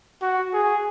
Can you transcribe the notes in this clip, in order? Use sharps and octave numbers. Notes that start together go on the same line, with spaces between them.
F#4
G#4